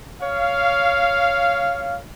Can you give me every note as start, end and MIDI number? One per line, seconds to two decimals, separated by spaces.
0.21 1.98 73
0.21 1.98 77